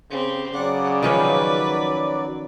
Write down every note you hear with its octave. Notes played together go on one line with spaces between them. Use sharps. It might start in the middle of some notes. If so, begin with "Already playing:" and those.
C#3 C4 G4
C#3 F#3 D5 F#5
D#3 F3 C#4 B4